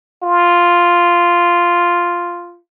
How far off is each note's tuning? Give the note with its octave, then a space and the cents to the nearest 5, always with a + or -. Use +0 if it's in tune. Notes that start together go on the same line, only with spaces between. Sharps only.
F4 +0